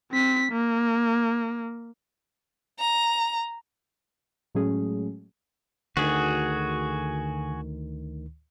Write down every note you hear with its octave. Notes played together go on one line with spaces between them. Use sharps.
C4 B6
A#3
A#5
A2 F#3 G#3 A3 C#4 G#4
D2 D3 D#3 F#4 G#4